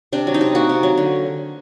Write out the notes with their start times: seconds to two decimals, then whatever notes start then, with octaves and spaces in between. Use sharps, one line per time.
0.12 C3 D4
0.27 F#3
0.34 D#4
0.41 C3
0.55 A#3 F#4
0.69 C3
0.83 F#3
0.97 D3